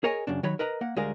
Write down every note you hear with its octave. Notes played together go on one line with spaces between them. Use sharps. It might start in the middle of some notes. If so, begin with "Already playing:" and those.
G#4 A#4 C#5 D#5 G#5
F#2 C#3 D4
D#3 F#3 C#5 B5
A#4 B4 D#5 A#5
A#3 F#5
D2 G3 G#3 G#4 A#4 F5